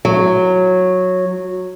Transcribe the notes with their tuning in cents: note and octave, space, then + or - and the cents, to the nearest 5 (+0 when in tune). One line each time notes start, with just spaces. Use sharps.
F#3 -10